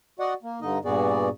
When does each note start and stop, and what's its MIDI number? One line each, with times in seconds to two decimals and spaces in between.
0.19 0.34 66
0.19 0.34 74
0.19 0.34 75
0.19 0.34 78
0.43 0.60 58
0.61 0.78 43
0.61 0.78 50
0.61 0.78 63
0.61 0.78 75
0.85 1.29 43
0.85 1.29 46
0.85 1.29 59
0.85 1.29 66
0.85 1.29 68
0.85 1.29 74